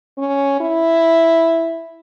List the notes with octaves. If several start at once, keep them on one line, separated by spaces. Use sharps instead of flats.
C#4
E4